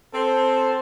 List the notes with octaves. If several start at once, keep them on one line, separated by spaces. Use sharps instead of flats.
C4 A4 C5